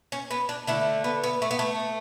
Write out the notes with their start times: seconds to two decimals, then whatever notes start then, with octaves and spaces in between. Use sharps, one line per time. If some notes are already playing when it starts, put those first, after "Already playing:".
0.12 C#4
0.31 B3
0.49 D4
0.67 D3 A3 E4
1.04 B3
1.24 B3
1.42 A3
1.51 B3
1.59 A3